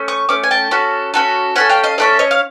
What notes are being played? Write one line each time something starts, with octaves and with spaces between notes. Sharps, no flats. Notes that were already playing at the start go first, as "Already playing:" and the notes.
Already playing: A3 C#4
C#6 D#6
A3 C#4 D6
G#5
G5 A5
C#4 F#4 A4
C#4 F#4 A4
C#4 F#4 A4 F#5 G#5
F5 G5
D#5 F5
C#4 F#4 A4 D5 E5
C#5 D#5
F5